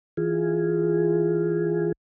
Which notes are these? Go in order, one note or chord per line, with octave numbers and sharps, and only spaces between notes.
E3 F4 G#4